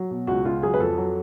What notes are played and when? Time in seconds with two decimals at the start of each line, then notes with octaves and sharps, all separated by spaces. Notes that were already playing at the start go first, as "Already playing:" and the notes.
Already playing: F#3
0.11 B2
0.27 C#2 F#4
0.45 C#2 F4
0.63 F#3 G#4
0.74 B4
0.80 F2 A4
0.97 F#3